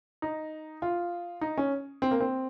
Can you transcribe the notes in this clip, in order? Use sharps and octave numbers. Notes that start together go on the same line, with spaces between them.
D#4
F4
D#4
C#4
C4
A#3
C4